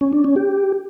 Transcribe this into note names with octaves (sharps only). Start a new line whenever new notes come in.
C#4
D4
C#4
G4